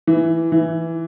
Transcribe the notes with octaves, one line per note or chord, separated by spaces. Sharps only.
E3
E3